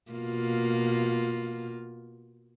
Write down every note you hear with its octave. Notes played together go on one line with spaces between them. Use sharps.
B2 A#3 F4